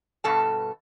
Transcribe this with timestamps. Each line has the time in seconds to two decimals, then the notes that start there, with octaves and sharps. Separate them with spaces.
0.24 G2 B2 A4 A5